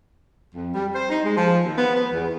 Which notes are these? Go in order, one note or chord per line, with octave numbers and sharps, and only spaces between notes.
F2
G3
C5
D#4
G#3
F3
D#2
B3
B3
E2